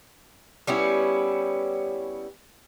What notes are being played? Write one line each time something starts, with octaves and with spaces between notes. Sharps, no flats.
G3 B3 C#4 E4